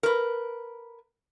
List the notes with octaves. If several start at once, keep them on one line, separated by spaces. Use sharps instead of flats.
A#4 B4